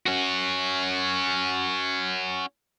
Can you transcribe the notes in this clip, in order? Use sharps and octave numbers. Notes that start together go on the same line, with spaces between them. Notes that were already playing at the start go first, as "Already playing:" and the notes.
C#4 F#4